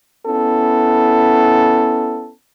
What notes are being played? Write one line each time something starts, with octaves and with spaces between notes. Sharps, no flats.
B3 C#4 E4 A4